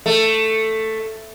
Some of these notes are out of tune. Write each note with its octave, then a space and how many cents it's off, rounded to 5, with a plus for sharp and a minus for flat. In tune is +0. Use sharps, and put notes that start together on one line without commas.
A3 +5